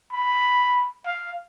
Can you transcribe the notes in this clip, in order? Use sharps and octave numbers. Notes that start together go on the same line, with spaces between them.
B5
F5